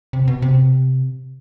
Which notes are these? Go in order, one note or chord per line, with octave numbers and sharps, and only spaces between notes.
C3
B2
C3